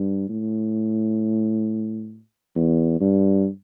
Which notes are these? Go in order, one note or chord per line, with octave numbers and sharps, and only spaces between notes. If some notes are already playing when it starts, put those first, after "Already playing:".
Already playing: G2
A2
E2
G2